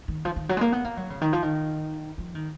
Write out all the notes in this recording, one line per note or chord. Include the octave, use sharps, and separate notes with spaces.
D#3
F3
D#3
F#3
G#3
A#3
B3
A#3
F#3
C#3
D#3
F3
D#3
F3
D#3